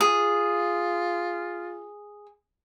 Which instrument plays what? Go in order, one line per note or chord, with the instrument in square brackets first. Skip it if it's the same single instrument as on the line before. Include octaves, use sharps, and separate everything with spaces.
[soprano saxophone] F4 [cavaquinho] G#4